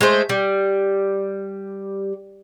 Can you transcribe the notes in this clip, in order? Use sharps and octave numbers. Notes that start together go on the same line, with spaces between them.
G#3 A3 C5
G3